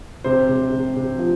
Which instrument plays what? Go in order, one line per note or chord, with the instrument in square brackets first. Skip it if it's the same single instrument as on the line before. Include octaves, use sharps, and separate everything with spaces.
[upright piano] C3 C5
C3
C3
C3
F3